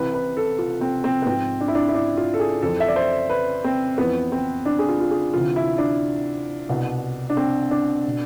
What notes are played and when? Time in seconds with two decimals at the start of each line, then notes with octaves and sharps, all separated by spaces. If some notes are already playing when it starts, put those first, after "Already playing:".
Already playing: C2 C3 E3 B4
0.14 B4
0.37 A4
0.58 F4
0.81 C4
1.04 C4
1.22 B3
1.26 G#2 F3 C4
1.61 D4
1.68 E4
1.75 D4
1.88 E4
1.94 D4
2.17 F4
2.34 A4
2.40 G#4
2.62 F2 E3 A4
2.80 E5
2.88 D5
2.96 C5
3.30 B4
3.64 C4
3.98 F2 E3 B3
4.32 C4
4.66 D4
4.79 G#4
4.89 F4
5.00 F4
5.11 G#4
5.34 D2 C3 E3 F4
5.56 E4
5.78 D4
6.69 C2 B2
7.30 D4
7.37 C4
7.71 D4
8.07 B2